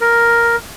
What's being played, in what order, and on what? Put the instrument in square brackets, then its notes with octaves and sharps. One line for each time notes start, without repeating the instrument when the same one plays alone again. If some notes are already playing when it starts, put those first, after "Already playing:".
[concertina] A#4